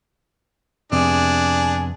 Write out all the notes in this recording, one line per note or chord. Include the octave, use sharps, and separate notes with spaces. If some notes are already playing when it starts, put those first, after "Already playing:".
F2 C3 B3 D4 G#4